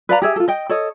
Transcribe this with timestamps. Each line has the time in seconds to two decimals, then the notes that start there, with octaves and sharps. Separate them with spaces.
0.09 B4 D5 F5 A#5
0.22 G4 G#4 E5
0.36 F4 A4
0.48 D#5 G5
0.69 A4 C#5 D#5